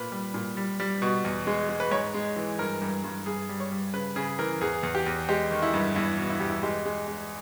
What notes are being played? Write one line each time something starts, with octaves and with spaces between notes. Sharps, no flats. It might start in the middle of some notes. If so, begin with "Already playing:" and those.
Already playing: A#2 B4
G3
A#2
G3
G3
B2
E2
G#3
G#3
B4
G#2 C#5
G#3
E3
G2 A#4
G2
G2
G2 G#4
G3
C#5
G3
C#3 B4
C#3 G#4
E3 A#4
E2 G#4
E2
G4
E2
G#3 G4
D#3
E4
G2
E2 E4
B2
E4
E2 G4
E4
G#3 G4
G#3
G#3